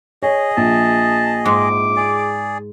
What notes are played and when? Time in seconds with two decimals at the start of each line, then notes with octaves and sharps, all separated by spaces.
0.23 G#4 C#5 D#5
0.57 A#1 A5
1.46 G#2 D6
1.96 G#4 D5